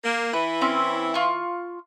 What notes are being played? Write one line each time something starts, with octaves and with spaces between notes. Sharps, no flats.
A#3
E3 E4 B4
C4 C#4 D6
F4 C#6